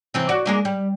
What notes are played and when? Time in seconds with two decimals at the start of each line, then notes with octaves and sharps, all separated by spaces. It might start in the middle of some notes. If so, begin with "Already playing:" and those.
0.14 C3 E3 C4
0.29 F#4 D5
0.46 G#3 A#3 D4
0.65 G3